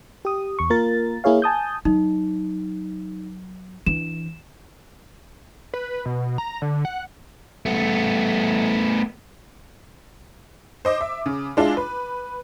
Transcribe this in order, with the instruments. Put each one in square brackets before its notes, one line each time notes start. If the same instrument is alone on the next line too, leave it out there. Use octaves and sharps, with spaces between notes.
[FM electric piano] G4 D#6
E2 C#6
A#3 F4 A#4 A6
A#3 E4 G#4 C#5 F5
G#5 A5 D#6 G6
[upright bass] F#3 [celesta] D#4
[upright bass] E3 D4 [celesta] E7
[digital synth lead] B4
B2
A#5
D3
F#5
[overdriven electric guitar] A3 B3
[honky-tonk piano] C5 D#5 D6
E5
C#3
G#3 D4 E4 F4
B4